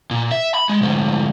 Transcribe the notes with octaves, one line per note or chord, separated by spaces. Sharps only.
A#2
E5
B5
G#3
D2 G#2